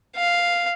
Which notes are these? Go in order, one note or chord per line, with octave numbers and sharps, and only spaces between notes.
F5